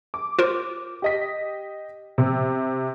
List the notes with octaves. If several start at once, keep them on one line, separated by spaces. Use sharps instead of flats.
D6
F4 A#4 C5
G4 D#5 B6
C3